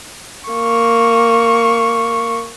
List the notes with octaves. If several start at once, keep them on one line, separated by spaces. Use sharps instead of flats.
A#3 C#6